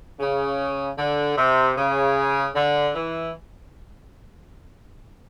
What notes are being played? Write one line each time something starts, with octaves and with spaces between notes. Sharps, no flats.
C#3
D3
C3
C#3
D3
E3